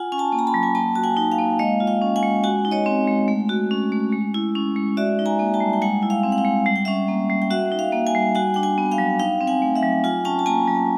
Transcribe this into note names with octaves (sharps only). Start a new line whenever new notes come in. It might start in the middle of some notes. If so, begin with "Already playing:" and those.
Already playing: F4 F#5 G#5
C#4 G#5
G5 A5
A#3
A#5
A5 B5
F#3
G#5
A#3 G5 A5
F#4 A5
F#5 G#5
D#4
F5 G5
A#3
G#3 D#5 F5
F4
F5 G5
C#4
F#5 G#5
G#3
F#4 F#5 G#5
D#4
C#5 D#5
C4
G#3
A3
F#4
C#4
A3
G#3
E4
C#4
G#3
F#4 D5 E5
D#4
G#5 A#5
A#3
G5 A5
G3
G5
G#3 F#5 G#5
E4
F5 G5
C4
F#5
F5 G5
G#3
G3 F#5
G5
C#4 E5 F#5
A#3
G3
G5
F#4 E5 F#5
D#4
F5 G5
A#3
F#5 G#5
G3
F#4 F#5 G#5
D4 G5
F#5 G#5
B3
F5 G5
F#3
D#4 F5 G5
C4
F#5 G#5
A3
E5 F#5
F#3
F4 F#5 G#5
C#4 G5 A5
A5
A#3 G#5 A#5
F#3